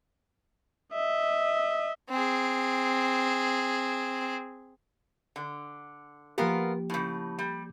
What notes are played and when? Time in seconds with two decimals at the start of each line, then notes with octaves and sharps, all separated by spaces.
0.93 D#5 E5
2.09 C4 G#4
5.36 D3
6.38 F3 A#3 B3 F4 G4 A#4
6.90 A2 C#3
7.39 G3